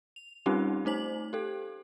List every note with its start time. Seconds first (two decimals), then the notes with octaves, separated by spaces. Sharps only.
0.16 F7
0.46 G3 C4 C#4 D#4 F4 G4
0.85 A3 D#4 C5 F#7
1.33 G4 A4